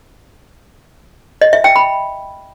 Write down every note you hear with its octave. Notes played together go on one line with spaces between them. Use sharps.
D#5
E5
G5
B5